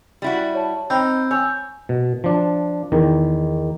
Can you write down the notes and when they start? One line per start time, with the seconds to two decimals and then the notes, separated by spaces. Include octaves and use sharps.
0.22 G3 E4 F#4
0.54 C#5 A5
0.90 C4 D#4 B5 E6 G6
1.31 C#5 G#5 E6 G6
1.89 B2
2.24 F3 D4
2.92 E2 D#3